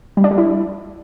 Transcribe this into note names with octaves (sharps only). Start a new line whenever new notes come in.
G3
D4
G3
E4